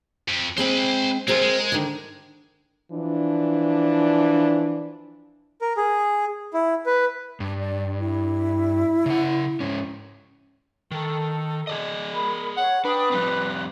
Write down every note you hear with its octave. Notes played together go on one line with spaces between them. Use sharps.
F2
G#3 C4 C5 G5 B5
G#3 C4 F4 G#4 A#4
G#3
D3 D#3
E3 F3 D4
A#4
G#4
E4
B4
G2
D5
E4
C#3 F#5
G#2 C#4
D#3 A4
G#4 D5 D#5
A#4 B5
C#5 F#5
D4 B4 G5 D#6
F3 G3 C4 F#6